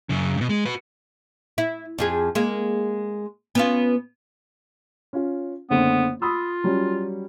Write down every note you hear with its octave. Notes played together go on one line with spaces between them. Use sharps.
F#2 C#3
G2 B2
G#3
F#4 B4
E4
F2 F3 G#4
G#3 A#3
B3 C#4 F4
C#4 F4
F#1 D3 B3 C4
F4 B5 D#6 E6
F#3 G3 C#4